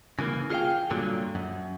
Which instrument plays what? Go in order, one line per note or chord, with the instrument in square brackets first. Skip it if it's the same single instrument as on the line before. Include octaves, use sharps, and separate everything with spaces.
[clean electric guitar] C#3 E3 G#3 A#3
F4 G#4 C#5 F5 G5
G2 A#2 D3 F#3
F#2